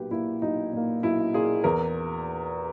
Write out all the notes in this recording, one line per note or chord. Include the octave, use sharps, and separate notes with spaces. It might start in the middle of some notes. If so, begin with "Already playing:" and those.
Already playing: B1 A#2 A#3 G4 B4
A#2 A#3 E4
B1 D#4
A#2 A#3
B1 E4
A#2 A#3 G#4
E2 A#4